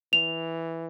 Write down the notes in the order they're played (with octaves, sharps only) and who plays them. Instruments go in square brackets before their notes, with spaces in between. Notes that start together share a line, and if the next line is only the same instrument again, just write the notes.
[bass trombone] E3 [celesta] F7